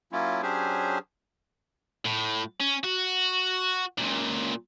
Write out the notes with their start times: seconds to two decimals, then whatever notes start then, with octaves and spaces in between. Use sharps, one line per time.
0.12 F#3 A#3 C#4 E4 F4
0.42 F#3 C#4 D4 G4 G#4 C5
2.06 A2
2.60 C#4
2.84 F#4
3.98 C#2 A#2